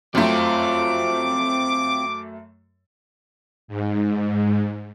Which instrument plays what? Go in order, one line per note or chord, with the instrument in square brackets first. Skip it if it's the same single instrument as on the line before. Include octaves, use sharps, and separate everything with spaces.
[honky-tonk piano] F#2 A3 [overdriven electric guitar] C4 F4 [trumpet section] D6
[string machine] G#2